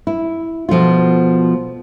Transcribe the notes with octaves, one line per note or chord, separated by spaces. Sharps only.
E4
B2 F3 A3 F4